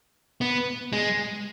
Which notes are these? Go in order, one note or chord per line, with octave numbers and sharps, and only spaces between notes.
B3
G#3